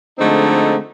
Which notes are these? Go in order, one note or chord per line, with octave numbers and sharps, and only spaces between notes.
D3 F3 G#3 A3 C4 D#4